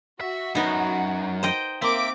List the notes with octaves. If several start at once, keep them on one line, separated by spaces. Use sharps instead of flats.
F#4 E5
F#2 B3 D#4
C5 D#5 G5
A#3 C4 E5 D6 D7